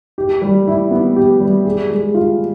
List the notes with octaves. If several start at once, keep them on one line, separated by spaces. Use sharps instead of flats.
G4
G3
E4
B3
G4
G3
G#4
G#3
F4